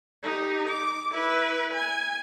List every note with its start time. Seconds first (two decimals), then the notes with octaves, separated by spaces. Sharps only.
0.23 D#4 G4
0.68 D6
1.12 E4 B4
1.73 G#5